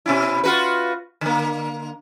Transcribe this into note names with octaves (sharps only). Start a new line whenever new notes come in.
B2 C#4 E4
F4 F#4 B4
D3 A#3